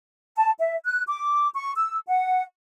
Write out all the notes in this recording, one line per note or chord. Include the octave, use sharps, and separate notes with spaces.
A5
E5
F#6
D6
C#6
E6
F#5